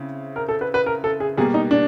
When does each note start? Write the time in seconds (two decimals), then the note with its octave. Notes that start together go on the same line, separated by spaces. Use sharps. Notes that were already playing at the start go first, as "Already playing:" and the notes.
Already playing: C#3 C4 E4
0.36 A#4
0.49 A4
0.61 B4
0.74 B4
0.86 A#4
1.04 A4
1.20 G#4
1.37 B2 G3 A#3 G#4
1.54 D#4
1.71 D4